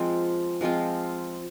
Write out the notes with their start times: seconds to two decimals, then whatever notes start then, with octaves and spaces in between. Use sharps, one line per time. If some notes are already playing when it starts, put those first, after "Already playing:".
Already playing: F3 G#3 C4 F4
0.61 F3 G#3 C4 F4